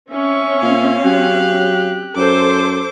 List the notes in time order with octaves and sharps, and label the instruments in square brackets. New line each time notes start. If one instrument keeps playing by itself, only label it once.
[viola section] C4 C#4 [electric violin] E5 C#6
[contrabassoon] A#2 [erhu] F5
[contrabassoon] F#3 [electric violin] G4 F#6
[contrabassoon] F#2 [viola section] A4 C5 [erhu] D6